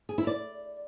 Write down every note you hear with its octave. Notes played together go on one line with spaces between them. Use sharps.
G#4
E4
D5